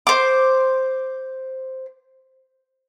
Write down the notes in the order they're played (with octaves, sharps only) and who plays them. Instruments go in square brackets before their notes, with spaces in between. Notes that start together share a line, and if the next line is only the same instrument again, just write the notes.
[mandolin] C5 D6